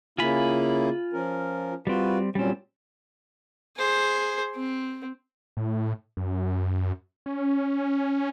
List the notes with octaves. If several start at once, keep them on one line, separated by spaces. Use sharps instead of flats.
C#3 A#3 E4 F4 G#5 B5
F3 C#4 A#4
G3 C4 F4 F#4 B4
A#2 F#3 G3 C4 C#4
G#4 C5
C4
A2
F#2
C#4